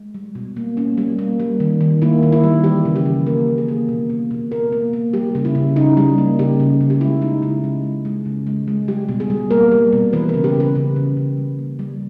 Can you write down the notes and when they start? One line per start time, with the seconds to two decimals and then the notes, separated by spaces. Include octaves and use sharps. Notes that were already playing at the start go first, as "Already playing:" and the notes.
Already playing: G#3
0.14 G3
0.35 B2
0.57 A#3
0.77 A#3 C#4
0.98 G3
1.19 A#3
1.40 G3
1.60 D#3
1.81 D#3
2.02 A#3 E4
2.23 D#3
2.32 E4
2.43 G3
2.64 E3 G4
2.85 C#3
2.96 G4
3.06 E3
3.26 A#3 A#4
3.47 A#3
3.58 G#4
3.68 A#3
3.89 B2
4.10 A#3
4.31 B2
4.51 A#3 A#4
4.72 A#3
4.93 A#3
5.13 G3 G4
5.35 C#3
5.45 E4
5.55 C#3
5.76 C#3 D#4
5.97 G3
6.18 A#3
6.39 C#3 G4
6.60 C#3
6.81 C#3
6.90 G4
7.00 G#3 E4
7.22 G#3 D#4
7.42 C#3 E4
7.64 G#3
7.84 G#3
8.05 G#3
8.26 C#3
8.47 G#3
8.68 G#3
8.88 G3 G4
9.09 B2
9.20 G#4
9.30 G3
9.51 A#3 A#4
9.72 G3
9.93 B2
10.13 E3 B4
10.29 A#4
10.34 C#3
10.44 G4
10.54 C#3
10.60 B4
10.75 C#3
10.96 C#3
11.17 C#3
11.37 G3
11.59 A#3
11.79 G3